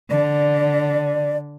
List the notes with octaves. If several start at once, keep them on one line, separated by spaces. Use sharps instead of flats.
D3 D5